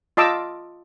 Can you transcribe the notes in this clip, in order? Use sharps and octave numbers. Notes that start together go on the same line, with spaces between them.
F4 D#5 A5 D6 E6